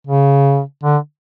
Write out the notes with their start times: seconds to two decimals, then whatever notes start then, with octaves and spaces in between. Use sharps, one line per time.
0.07 C#3
0.83 D3